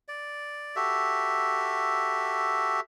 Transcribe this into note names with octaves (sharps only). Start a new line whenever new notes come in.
D5
F#4 G4 A4 E5